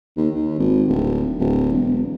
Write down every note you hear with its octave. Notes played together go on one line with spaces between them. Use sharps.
D#2
D#2
G#1
D1
D1
E1